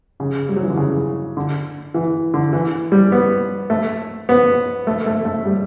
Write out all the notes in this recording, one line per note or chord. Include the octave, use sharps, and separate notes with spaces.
C#3
G3
F#3
E3
D3
C#3
D3
E3
D3
E3
G3
B3
A3
B3
A3
A3
A3
G3